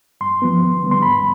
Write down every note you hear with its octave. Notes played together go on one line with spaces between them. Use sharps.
G2 C6
F3 B3
D#2
D3 G3 B3
C6
G#2 B5